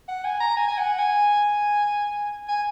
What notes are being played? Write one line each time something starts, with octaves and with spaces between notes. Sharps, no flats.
F#5
G#5
A#5
G#5
G#5
F#5
G#5
G#5